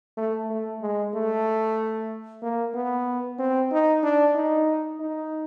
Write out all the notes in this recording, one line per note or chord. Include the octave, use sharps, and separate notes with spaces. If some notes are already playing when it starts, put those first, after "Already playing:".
A3
A3
G#3
A3
A#3
B3
C4
D#4
D4
D#4
D#4